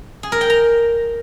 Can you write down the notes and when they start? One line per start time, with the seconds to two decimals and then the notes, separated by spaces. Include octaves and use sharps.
0.23 G#4
0.32 A#4
0.41 G5
0.50 A#5